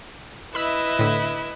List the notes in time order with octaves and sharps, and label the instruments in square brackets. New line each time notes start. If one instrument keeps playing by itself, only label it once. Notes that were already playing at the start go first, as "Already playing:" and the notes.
[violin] E4 E5 [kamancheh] B4 D#5 [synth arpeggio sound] B5 E6
[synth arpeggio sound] A2 D3